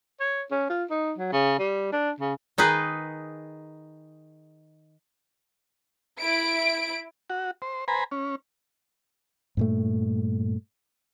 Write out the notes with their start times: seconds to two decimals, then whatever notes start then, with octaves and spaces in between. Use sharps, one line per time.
0.20 C#5
0.51 C#4
0.69 F4
0.90 D#4
1.18 F#3
1.32 C#3
1.59 G3
1.93 D4
2.20 C#3
2.58 D#3 D#4 G#4 B4
6.19 E4 D7
7.30 F#4
7.62 C5
7.88 B4 C5 G#5 A#5 B5
8.12 C#4
9.57 G2 A#2 A3